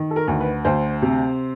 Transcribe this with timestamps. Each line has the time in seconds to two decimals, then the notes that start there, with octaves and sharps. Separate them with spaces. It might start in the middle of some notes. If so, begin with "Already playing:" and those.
Already playing: D#3
0.11 A4
0.16 A#4
0.28 D2
0.40 B4
0.65 D2 C5
1.02 C3